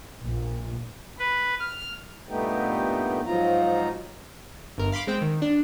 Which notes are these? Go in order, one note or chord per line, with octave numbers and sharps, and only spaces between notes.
A#1 A#2
B4
F6
G2 A#2 A3 B3 D#4 G4
G#2 F3 F#3 D#4 F4 A#5
G1 A#4
F5 B5 C6 D6
G#3 C4 G5
D#3
D4